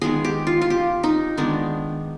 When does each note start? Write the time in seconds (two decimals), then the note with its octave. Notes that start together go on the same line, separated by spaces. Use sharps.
0.02 D#3 G#3 B3 G#4
0.24 G4
0.47 F4
0.62 F4
0.70 G4
1.04 D#4
1.37 D#3 G#3 B3 D4